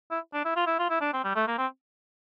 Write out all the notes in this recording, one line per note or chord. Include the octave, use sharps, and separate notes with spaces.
E4
D4
E4
F4
E4
F4
E4
D4
C4
G3
A3
A#3
C4